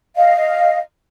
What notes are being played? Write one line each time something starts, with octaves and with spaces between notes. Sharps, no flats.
D#5 F5